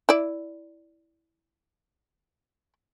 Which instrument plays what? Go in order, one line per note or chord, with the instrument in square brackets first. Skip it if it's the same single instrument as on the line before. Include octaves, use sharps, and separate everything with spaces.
[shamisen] E4 D5